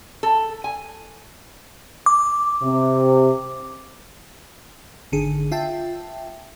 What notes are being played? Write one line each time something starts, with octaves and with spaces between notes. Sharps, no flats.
A4
G#5
D6
C3
G#1 D3 G#4
F4 E5 G5 A5